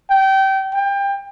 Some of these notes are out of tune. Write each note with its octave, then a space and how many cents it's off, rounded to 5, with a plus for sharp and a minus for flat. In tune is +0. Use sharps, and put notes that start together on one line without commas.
G5 -25
G5 +25